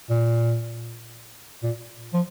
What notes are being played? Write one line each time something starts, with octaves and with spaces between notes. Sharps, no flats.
A#2
A#2
F3